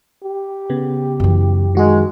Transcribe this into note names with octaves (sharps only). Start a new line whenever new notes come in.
G4
C#3 B3
F#2 E3
D#3 G#3 F#4 G#4